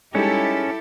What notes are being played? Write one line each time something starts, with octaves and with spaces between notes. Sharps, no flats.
G3 G#3 C#4 D#4 E4 G4 A4